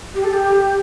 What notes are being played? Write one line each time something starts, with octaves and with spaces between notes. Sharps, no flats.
G4
A4
G4